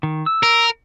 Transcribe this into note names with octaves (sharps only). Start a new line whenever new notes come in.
D#3
E6
A#4